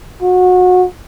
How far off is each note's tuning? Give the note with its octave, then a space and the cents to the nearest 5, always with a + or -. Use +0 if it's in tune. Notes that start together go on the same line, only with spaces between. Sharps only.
F#4 -25